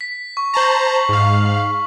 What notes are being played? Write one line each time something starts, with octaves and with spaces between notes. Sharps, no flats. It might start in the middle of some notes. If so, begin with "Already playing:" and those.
B6
C#6
C5 A5 A#5 C#6 F#7
G#2 F5